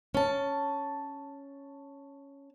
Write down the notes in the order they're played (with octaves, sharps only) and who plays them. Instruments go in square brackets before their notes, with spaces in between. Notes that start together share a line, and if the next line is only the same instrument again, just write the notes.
[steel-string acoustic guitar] C#4 A5